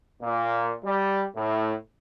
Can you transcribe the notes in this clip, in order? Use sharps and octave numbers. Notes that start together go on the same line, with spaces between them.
A#2
G3
A2